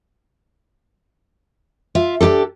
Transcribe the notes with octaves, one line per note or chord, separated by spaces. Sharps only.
F4 E5
D4 D#4 G4 A4